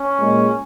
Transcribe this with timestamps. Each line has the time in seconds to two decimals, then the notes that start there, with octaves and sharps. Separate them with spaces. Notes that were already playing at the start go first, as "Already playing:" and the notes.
Already playing: C#4
0.19 A#2 G#3